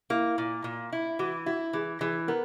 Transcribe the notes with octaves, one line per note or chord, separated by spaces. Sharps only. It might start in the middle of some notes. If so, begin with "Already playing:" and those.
A#3 E4
A#2
A#2
E4
E3 F#4
E4 F#4
E3 G#4
E3 G#4
B3 A#4